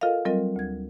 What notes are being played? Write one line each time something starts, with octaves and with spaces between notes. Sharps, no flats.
F4 A4 A#4 D#5 F5
F#3 G3 C4 F4 A#4 D#5
D2 G#6